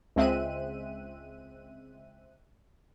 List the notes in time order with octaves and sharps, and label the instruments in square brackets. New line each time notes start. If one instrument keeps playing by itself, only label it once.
[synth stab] C#2 G#3 C4 E5 F#6 D#7